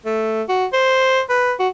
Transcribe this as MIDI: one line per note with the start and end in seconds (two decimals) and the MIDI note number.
0.06 0.43 57
0.49 0.66 66
0.73 1.21 72
1.29 1.54 71
1.59 1.69 66